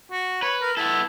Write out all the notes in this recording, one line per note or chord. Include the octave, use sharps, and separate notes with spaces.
F#4
B4 C#5
A#4
B3 E4 A4